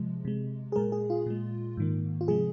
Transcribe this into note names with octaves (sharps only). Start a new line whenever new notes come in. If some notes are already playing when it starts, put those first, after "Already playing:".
Already playing: C3 F3 G#3
C3 G#3
G#4
A#2 G#3 A#4
G#4
F4
A#2 G#3
G#2 D#3 A#3
F4
C3 F3 G#3 G#4